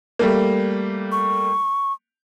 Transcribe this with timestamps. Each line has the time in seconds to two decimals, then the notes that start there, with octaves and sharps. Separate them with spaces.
0.19 G3 A3 A#3
1.12 C#6